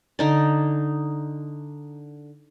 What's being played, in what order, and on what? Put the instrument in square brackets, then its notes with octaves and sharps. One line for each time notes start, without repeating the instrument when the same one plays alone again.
[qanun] D3 D#4 D5